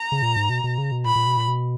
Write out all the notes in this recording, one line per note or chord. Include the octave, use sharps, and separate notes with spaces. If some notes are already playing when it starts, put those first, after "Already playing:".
Already playing: A#5
C#3
A#2
G#2
B2
B2
C#3
B2
A#2 B5
A#2
B2
A#2
B2